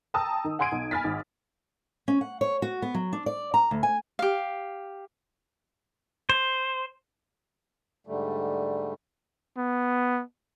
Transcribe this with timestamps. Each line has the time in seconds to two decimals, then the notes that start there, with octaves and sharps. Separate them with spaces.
0.14 G5 A5 A#5 D#6 E6
0.44 D#3
0.59 F#5 G#5 C6 G#6 D7 D#7
0.72 B1
0.91 G#5 B5 F6 A6 B6
1.04 G#1
2.08 C#4
2.21 F#5
2.41 C#5
2.62 F#4
2.82 B3
2.95 F#3
3.13 D4
3.26 D5
3.54 A#5
3.71 D2
3.83 G#5
4.19 G4 F5
6.29 C5
8.07 G#2 D3 G3 A3
9.57 B3